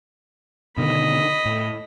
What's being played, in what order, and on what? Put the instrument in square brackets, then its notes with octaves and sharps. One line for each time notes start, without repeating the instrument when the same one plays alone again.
[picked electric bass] B2 D3 D#3 [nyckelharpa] D#5 B5
[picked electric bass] A2